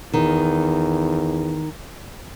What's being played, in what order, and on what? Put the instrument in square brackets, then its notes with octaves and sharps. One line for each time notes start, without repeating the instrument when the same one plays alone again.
[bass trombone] E2 [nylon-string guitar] D#3